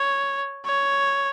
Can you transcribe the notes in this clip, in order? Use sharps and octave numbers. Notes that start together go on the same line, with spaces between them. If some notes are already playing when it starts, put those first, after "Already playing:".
Already playing: C#5
C#5